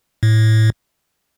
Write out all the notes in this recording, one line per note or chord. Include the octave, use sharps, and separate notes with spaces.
A2